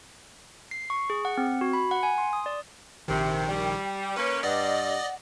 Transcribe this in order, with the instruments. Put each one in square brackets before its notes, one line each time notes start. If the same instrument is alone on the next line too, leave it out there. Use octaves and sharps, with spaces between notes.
[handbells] C7
C#6
G#4
F#5
C4
F#4
B5
F#5
G#5
C6
D#6
D5
[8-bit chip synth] A#1 D#3 [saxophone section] C3 [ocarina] G5
[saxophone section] G3
[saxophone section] A#3 C#4 [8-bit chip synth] B4
[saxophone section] G2 [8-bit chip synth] D5 D#5 [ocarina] F#5